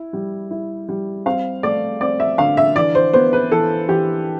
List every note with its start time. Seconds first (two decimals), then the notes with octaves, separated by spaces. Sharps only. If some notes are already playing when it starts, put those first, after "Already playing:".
Already playing: E4
0.13 G3
0.51 E4
0.89 G3
1.26 C4 F5
1.63 A3 D5
2.01 C4 D5
2.20 E5
2.38 D3 F5
2.57 E5
2.76 E3 D5
2.95 C5
3.13 B3 C5
3.33 B4
3.51 E3 A4
3.88 E3 G4